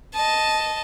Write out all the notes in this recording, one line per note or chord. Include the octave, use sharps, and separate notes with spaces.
D#5 A5